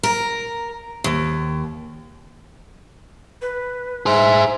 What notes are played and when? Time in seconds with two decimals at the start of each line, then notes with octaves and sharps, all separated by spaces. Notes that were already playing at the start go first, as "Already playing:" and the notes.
0.03 A#4
1.04 D#2
3.42 B4
4.06 G#4 C5 E5